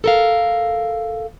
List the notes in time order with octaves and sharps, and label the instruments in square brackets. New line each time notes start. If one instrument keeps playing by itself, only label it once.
[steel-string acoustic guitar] A4 A#4 F5